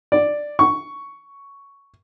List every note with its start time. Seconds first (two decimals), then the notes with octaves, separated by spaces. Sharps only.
0.12 D5
0.59 C#6